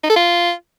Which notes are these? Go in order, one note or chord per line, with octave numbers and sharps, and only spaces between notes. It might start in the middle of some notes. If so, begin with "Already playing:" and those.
D#4
A4
F4